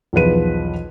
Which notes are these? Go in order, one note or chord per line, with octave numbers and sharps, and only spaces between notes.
B1 E2 F3 B4 D#7